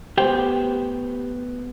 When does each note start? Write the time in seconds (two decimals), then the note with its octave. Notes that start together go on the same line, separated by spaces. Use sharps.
0.17 A3 B3 G4 B4 C5 G5